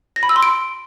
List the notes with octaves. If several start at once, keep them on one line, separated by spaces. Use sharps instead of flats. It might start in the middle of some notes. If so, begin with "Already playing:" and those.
A#6
B5
E6
C6
D7